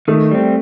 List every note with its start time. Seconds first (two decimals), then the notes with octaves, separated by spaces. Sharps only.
0.08 D#3 A3
0.31 G3 C4